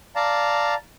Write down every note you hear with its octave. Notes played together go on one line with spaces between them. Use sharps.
D5 F5 A5 A#5